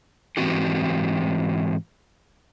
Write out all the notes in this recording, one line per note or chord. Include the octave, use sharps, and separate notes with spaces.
G#2 B2 E3 C4 F#4 G4